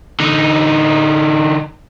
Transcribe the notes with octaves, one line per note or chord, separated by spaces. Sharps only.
D3 D#4